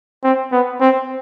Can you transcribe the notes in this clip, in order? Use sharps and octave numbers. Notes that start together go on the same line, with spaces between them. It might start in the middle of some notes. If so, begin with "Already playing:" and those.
C4
B3
C4